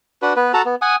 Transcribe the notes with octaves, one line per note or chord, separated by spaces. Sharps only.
D4 F#4 B4
B3 B4
F#4 A4 A5 A#5
B3
F#5 G#5 D#6